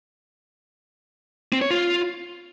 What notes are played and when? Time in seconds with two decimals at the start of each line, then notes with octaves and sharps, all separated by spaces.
1.52 C4
1.62 C#5
1.71 F4